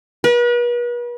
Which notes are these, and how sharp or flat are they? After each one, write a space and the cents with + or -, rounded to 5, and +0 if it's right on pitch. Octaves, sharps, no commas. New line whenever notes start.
B4 -40